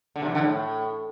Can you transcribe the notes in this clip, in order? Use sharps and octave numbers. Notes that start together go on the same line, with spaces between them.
D3
C3
E3
D3
A2